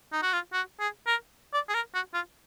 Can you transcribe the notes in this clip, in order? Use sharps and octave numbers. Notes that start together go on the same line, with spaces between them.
D#4
F#4
F4
F#4
G#4
A#4
D5
G#4
A#4
F#4
F4